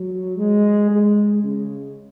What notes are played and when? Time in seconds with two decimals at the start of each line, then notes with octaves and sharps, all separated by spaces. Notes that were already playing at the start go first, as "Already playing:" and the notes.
Already playing: F#3
0.37 G#3
0.90 G#3
1.44 C#3